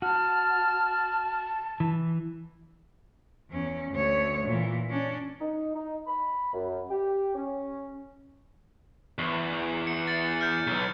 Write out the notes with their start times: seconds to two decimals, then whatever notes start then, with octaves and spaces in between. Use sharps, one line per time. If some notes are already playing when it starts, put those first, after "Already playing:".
0.02 F#4 A5 F6
1.80 E3
3.50 E2 C#4
3.91 D2 C#5
4.46 A#2 E3
4.90 C#4 D4
5.41 D#4
5.76 D#4
6.07 B5
6.54 F#2
6.90 G4
7.35 C#4
9.18 E2
9.87 C#7
10.08 A6 C#7
10.41 F6 G6
10.67 B1